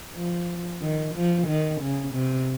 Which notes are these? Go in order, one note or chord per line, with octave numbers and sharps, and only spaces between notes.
F3
D#3
F3
D#3
C#3
C3